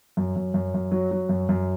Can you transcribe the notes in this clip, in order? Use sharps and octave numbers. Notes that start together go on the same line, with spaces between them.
F#2
F#2
F#2
F#2
F#3
F#3
F#2
F#2